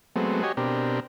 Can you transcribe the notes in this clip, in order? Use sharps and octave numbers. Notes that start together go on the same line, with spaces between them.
F#3 G#3 A3 B3 C4
F#4 G4 C#5 D#5 G#5
B2 C4 D4 G4 A#4